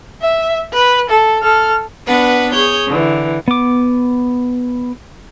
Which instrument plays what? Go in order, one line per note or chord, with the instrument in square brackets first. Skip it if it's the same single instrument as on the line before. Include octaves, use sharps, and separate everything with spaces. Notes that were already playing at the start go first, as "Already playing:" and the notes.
[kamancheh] E5
B4
A4
A4 F6
[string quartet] B3 D4 B4 F#5
G#4 C#5 G6
D3 E3
[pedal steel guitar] B3 D6